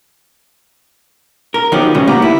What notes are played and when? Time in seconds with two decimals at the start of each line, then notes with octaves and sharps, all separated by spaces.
1.54 A#4
1.72 D#3 F3 F#3 B3 D#4 G4
1.95 G2 C#3 F3 G3 G#3
2.07 D2 A#3 B3 G4 A#5
2.22 E4